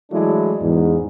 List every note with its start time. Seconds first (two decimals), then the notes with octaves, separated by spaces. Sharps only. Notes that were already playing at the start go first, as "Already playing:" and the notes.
0.12 E3 F#3 G#3 A3 D4 E4
0.61 E2 G#2